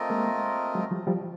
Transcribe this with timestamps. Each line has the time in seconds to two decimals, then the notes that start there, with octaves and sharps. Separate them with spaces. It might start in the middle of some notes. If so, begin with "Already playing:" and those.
Already playing: A3 C4 F4 A#4 D#5
0.10 G#3 A#3
0.75 F#3 G#3
0.91 F3 G3
1.07 F3 G3